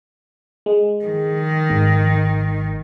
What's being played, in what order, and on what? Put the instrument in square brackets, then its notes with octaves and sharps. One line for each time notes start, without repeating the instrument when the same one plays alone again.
[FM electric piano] G#3
[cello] D#3
[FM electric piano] G#1 G#2